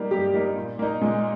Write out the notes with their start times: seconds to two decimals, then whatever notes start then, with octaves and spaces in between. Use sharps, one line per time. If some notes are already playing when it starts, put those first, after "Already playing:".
Already playing: G3 A#3 D#4
0.11 G2 G4
0.33 G3 A#3 D#4
0.56 A#2
0.79 A#3 D#4
1.01 A#2 G#3